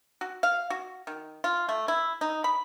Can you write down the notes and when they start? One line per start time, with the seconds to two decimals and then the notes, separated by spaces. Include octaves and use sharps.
0.21 F#4
0.43 F5
0.70 F#4
1.07 D#3
1.44 F4
1.69 A3
1.88 E4
2.21 D#4
2.44 B5